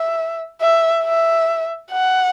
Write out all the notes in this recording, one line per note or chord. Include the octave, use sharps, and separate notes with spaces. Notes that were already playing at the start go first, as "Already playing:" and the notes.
Already playing: E5
E5
E5
F#5